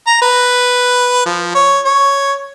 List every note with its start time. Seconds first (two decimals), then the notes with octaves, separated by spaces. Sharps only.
0.07 A#5
0.22 B4
1.26 F3
1.55 C#5
1.85 C#5